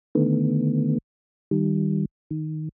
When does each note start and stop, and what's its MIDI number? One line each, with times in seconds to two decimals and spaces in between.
0.15 0.98 50
0.15 0.98 51
0.15 0.98 57
0.15 0.98 59
1.51 2.05 51
1.51 2.05 55
2.31 2.69 51